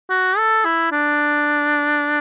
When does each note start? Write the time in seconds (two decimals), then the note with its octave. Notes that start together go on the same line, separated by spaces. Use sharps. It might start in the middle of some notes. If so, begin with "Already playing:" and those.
0.10 F#4
0.38 A4
0.65 E4
0.92 D4